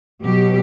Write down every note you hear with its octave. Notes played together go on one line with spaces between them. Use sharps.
B2 F#3 G4